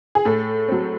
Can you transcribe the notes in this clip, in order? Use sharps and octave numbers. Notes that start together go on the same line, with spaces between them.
G#4
A2 A4
F#3 C4